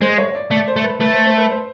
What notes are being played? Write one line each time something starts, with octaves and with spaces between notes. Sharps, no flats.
G#3 C5
C#5
D5
A3 D5
C5
A3
B4
A3 B4
C5
C5
B4
C5